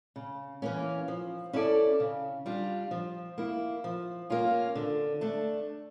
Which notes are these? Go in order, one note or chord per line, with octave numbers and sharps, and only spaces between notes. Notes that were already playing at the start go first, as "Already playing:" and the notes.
C#3
E3 A#3 C#4
F3
C#4 E4 A4 D5
C#3
G3 D4 F4
F3
A#3 E4
F3
A#3 C#4 F4
D3
A3 D4